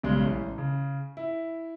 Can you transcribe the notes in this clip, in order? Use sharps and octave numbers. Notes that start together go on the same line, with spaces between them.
B1 C#3 G3 G#3
A1
C#3
E4